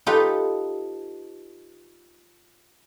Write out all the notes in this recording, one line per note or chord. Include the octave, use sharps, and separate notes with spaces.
D#4 F4 G4 A4 B4